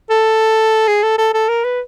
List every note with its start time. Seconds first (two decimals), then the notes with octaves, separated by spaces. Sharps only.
0.10 A4
0.88 G#4
1.03 A4
1.18 A4
1.34 A4
1.49 A#4
1.64 B4